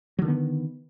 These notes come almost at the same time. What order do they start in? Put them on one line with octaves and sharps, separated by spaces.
F#3 D3 D#3 B3